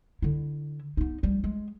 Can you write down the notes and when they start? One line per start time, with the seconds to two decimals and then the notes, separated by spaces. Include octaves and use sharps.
0.22 D3 E4
0.97 B3 D#4
1.23 F3 G3
1.44 G#3